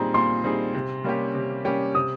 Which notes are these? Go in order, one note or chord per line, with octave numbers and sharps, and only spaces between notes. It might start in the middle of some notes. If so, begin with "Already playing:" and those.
Already playing: A#2 G3 C4 D#4 G#4 A#5
A#2 C6
G3 C4 D#4 G#4
C3
G3 A#3 C#4 G4
C3
G3 A#3 C#4 G4
C3 D#6